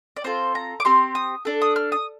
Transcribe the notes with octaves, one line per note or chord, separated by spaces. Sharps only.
D5
C4 F4 A4 C5
A#5
D6
C4 G4 C6
D#6
D4 A4
D#6
F6
D#6